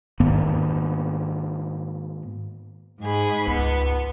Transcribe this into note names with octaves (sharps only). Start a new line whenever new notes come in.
G#2 D#3 A#3 B3
G#2 G#4 B5
C#2 B3